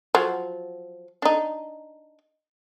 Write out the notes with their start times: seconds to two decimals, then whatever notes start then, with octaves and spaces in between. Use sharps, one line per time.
0.15 F3 F#3
1.22 D4 D#4